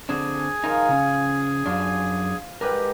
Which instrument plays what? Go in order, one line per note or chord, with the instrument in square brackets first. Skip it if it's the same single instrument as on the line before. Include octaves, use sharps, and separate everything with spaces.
[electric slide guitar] D3 C4 D4 [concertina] G#4 G#5
[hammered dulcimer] F3 [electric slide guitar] D#4 A#4
[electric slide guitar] C#3 C#4
[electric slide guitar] F#2 D4 [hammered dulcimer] F4
[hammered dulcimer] G#2 G3 [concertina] G4 [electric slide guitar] A#4 B4